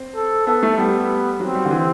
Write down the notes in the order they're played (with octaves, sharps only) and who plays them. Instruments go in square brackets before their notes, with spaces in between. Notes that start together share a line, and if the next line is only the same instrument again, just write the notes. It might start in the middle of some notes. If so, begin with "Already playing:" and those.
Already playing: [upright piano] C4
[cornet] A4
[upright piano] B3 [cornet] A4
[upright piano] A3
[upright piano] G3 [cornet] B3
[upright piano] F#3 [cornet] C4
[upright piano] G3
D3
E3